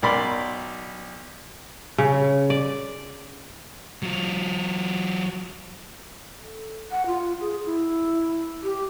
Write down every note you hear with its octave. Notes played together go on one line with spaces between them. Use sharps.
B1 A#4 D5 B5 C6
C#3
D5
F#3 F4
A4
F#5
F4
G#4
E4
G4